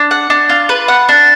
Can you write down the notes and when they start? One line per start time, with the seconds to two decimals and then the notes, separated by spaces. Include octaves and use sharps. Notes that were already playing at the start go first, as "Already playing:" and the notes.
Already playing: D4
0.11 F#5
0.30 D4
0.49 F4
0.69 B4
0.88 F#5
1.09 D4